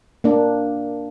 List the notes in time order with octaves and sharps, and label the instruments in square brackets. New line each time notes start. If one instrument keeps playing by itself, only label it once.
[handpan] A#3 D4